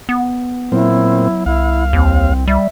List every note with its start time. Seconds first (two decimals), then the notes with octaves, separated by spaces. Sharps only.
0.09 B3
0.72 A#2 F#3 C4 E4
1.46 C2 E4 F5
1.93 D#2 C4
2.47 G3 E5